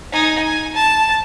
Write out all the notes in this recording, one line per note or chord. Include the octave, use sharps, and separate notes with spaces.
D#4 G#5
G#5
A5